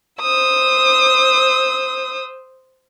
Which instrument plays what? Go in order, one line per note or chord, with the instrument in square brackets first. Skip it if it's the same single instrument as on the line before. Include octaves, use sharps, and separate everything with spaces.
[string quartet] C5 D#6 E6